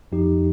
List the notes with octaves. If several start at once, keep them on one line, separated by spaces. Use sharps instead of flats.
F2 F3 D#4 G4